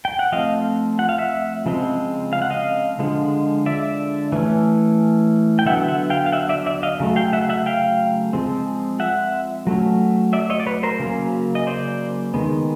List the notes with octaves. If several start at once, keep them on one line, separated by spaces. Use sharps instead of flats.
G5
F#5
F3 A3 C4 D#5 F5
F#5
F5
E5 F#5
C#3 F3 G#3 C4
F5
F#5
D#5 F5
D3 F3 G#3
D5 E5
E3 A3 C#4
G5
D3 F#3 B3 E5 F#5
E5 F#5
F5 G5
F5
E5 F#5
D5 E5
D5 E5
D#5 F5
C#3 F#3 A3
F5 G5
E5 F#5
E5 F#5
F5 G5
F3 G#3 C4
E5 F#5
F#3 A3 C#4
D5 E5
C#5 D#5
D5
B4 C#5
A#4 C5
C#3 F#3 A#3 C#4
D#5
C5 D5
D#3 G#3 B3